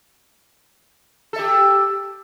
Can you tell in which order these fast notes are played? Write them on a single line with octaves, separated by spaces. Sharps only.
A4 E5 G4